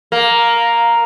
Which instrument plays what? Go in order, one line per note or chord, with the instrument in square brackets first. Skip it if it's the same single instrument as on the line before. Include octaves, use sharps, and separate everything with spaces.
[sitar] A#3